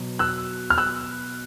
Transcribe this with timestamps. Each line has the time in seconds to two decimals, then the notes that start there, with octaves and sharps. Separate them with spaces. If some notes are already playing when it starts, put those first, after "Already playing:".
Already playing: B2 F#3
0.19 E6 F#6
0.70 F6
0.78 E6 F#6